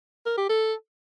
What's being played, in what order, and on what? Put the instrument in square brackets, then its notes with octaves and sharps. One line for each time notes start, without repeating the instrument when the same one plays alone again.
[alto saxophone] A#4
G4
A4